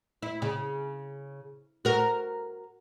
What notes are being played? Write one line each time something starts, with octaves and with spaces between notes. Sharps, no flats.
E4
C#3
F#4 A#4